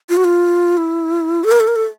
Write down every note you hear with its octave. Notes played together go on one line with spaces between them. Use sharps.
F4
F#4
F4
E4
A4
A#4
A4
A#4
A4